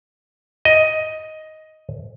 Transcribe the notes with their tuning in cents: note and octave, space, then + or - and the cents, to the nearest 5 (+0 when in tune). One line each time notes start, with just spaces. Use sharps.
D#5 +10